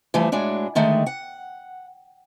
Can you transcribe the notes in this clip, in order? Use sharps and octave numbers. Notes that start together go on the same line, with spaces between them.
E3 F3 G3 A3
A2 G#3 D4 F#4
D3 D#3 G#3 A3
F#5